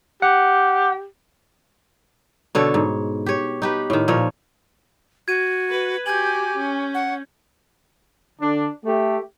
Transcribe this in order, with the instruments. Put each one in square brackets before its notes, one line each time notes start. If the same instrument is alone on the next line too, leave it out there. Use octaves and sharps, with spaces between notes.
[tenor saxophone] G4 [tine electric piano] F#5
[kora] B2 D3 A4 C#5
G#2
G4 C#5
D#4 G4 B4
A2 D#3
A#2 F3 C#5
[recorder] F#4 [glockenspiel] G#6 D#7
[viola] B4
[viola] F#4 G4 [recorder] G#5 [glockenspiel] G6 G#6 F#7
[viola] C#4
[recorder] F#5
[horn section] D3 D4
A3 G4